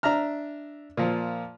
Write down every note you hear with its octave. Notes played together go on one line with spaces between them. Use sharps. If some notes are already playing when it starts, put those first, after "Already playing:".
D4 E5 A#5 F6
A#2 F3